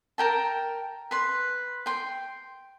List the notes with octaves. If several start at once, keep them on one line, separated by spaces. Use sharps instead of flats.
A#4 G5 A5
B4 C6
G5 C6